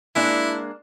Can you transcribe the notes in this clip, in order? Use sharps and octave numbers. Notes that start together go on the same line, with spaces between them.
G#3 A#3 D4 E4